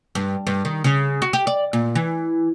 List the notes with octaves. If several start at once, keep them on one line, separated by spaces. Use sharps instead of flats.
G2
G2
D#3
C#3
F#4
G4
D5
A#2
E3